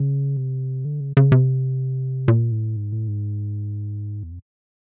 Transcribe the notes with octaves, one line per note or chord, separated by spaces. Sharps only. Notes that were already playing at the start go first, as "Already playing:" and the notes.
Already playing: C#3
C3
D3
C#3
C#3
C3
A#2
A2
G#2
A2
G#2
E2
F2